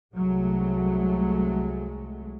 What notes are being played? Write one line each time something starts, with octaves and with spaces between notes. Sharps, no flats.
C2 F#3 G#3 A3